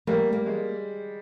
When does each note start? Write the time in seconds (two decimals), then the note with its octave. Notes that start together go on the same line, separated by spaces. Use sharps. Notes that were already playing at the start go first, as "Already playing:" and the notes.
0.07 G3 A#3
0.33 A#3
0.46 G#3